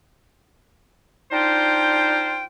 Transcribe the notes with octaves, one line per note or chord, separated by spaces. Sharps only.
D4 D#4 F4 C5 G5